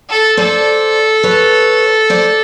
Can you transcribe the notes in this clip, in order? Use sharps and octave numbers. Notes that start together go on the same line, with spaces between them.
A4
A4 C5 D5
B4 C#5
C5 D5